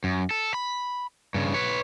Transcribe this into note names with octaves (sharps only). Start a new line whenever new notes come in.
F#2
A4
B5
G2 C#3
B4 C#5